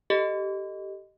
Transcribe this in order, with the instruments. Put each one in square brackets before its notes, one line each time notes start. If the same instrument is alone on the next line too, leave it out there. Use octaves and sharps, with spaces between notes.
[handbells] G4 A4 D#5